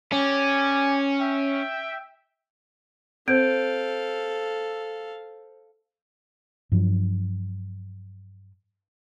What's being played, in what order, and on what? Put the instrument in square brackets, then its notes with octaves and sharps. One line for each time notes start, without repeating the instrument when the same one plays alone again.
[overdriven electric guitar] C#4 [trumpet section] G4 D5 G#5
[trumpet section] E5 G5
[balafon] C4 [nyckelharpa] A4 F5 [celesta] C5 G6 D7
[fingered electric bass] G2 F3 F#3